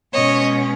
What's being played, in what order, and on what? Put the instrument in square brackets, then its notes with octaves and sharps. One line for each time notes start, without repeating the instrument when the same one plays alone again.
[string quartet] B2 G#3 C#4 C#5 D#5